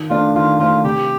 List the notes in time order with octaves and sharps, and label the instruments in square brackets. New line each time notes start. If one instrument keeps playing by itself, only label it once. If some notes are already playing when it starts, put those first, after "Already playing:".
Already playing: [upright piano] D#3
[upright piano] A3 D4 [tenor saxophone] F4
[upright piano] D#3 [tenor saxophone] F4
[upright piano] A3 D4 [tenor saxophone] F4
[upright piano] C3 [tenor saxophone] G4